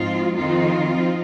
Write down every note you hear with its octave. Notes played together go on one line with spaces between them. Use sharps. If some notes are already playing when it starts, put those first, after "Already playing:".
Already playing: G#2 F3 C4 D#4 F4
F2 D#3 C4 D#4 F4
F3 C4 D#4